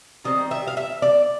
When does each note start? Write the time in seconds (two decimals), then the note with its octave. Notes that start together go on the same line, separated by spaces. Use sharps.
0.25 D#3 G3 C4 D#5
0.51 E5
0.67 F5
0.77 E5
1.02 D5